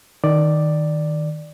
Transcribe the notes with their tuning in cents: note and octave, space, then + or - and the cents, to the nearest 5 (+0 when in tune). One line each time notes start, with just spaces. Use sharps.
D#3 +0 D5 +5